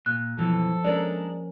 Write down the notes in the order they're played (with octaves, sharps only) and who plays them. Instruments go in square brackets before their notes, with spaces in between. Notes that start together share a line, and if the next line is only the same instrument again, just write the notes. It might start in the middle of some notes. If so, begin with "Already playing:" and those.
[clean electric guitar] A#2 [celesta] F#6
[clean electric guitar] F#2 B2 E3 [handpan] F3 [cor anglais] A4
[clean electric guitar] G#3 D4 [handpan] C#4 A#4 [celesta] D5